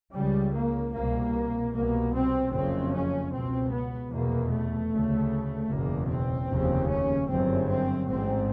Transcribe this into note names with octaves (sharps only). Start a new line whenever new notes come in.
C#2 C#3 G3
A#3
C2 B2 A#3
C2 B2 A#3
C4
F#1 F2 C#3 C4
C#4
C#2 B2 C4
B3
F1 E2 B2 A#3
A3
D2 C#3
F#1 E2 B2 A#3
C4
F1 D#2 C#3
C#4
G1 F#2 C#3 C4
C4
A1 G#2 C4